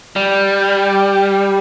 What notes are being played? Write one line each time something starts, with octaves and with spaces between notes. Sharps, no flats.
G3